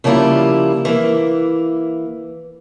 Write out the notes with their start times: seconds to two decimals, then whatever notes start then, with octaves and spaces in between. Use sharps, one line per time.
0.04 C#3 F3 G3 A#3 E4 F4
0.85 E3 A#3